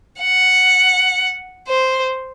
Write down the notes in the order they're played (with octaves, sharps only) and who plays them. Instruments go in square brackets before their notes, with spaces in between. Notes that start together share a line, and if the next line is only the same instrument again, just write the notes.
[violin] F#5
C5